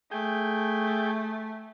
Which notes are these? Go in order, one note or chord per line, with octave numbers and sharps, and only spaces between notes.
A3 G#4 G5